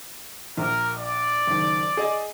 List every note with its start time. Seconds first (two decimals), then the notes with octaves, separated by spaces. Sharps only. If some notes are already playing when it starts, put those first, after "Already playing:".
0.57 A#1 A#4
0.96 D5
1.47 F#1 D#3
1.97 G#4 D#5